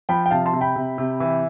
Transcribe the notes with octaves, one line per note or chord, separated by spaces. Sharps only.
F3 G5 B5
G5
C3 F5 A5
A5 C6
C3
G5 B5
C3
C3
E3